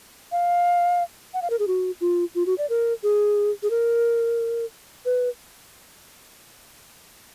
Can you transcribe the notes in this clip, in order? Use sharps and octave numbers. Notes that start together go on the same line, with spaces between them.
F5
F#5
F5
A#4
G#4
F#4
F4
F4
F#4
D5
A#4
G#4
G#4
A#4
B4